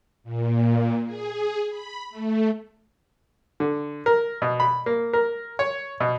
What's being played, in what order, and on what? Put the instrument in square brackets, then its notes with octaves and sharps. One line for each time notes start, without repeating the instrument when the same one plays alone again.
[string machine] A#2
G#4
B5
A3
[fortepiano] D3
A#4
B2
B5
A#3
A#4
C#5
B2